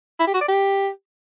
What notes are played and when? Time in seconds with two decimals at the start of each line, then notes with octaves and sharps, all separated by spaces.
0.20 E4
0.27 G4
0.34 F#4
0.41 D5
0.48 G4